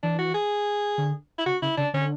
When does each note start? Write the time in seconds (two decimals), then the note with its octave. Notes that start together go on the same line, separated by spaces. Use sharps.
0.03 E3 D4
0.19 F#4
0.34 G#4
0.98 D3
1.38 E4
1.46 C#3 F#4
1.62 C#3 E4
1.78 C#3 D4
1.94 D3 C#4